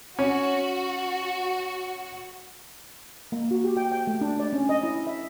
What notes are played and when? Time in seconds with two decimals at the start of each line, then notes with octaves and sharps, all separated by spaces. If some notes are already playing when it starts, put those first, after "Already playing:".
0.19 C#4 F#4
3.32 A#3
3.51 F#4
3.64 G4
3.77 G5
3.92 G5
4.07 A3
4.21 D4
4.40 D5
4.53 C#4
4.69 D#5
4.83 E4
5.07 E5